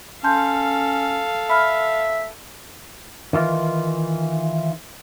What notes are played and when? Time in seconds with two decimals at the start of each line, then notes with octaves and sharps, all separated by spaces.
0.24 C#4 A4 F5 A5 C6 G6
1.50 E5 B5 F6
3.33 D#3 E3 F4